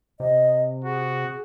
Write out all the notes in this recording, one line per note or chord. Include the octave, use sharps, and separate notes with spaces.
C3 D#5
F#4 G#4